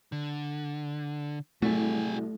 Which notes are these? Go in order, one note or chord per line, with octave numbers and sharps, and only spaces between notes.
D3
C2 A2 F#3 A3 F#4 G#4